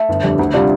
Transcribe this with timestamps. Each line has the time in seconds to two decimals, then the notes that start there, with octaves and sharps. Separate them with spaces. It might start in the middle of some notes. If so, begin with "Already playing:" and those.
Already playing: A3
0.09 G1
0.23 F2 D3 G3
0.39 D2
0.54 C3 G3 D4 F4